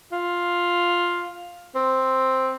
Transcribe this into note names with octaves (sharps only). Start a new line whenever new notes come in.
F4
C4